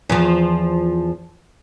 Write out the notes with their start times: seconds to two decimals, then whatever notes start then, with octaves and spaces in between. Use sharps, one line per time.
0.09 E2 F3